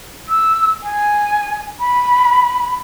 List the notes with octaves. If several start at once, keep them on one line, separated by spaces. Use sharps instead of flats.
E6
G#5
B5